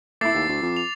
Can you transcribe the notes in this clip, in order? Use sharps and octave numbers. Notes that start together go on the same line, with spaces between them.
A3 E4 D6 A6 C7
D#2
D2
F2
F7